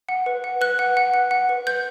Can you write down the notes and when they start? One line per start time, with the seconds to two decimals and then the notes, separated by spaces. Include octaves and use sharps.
0.09 F#5
0.26 B4
0.44 F#5
0.61 B4 F#6
0.79 F#5
0.97 F#5
1.14 F#5
1.31 F#5
1.49 B4
1.67 B4 G6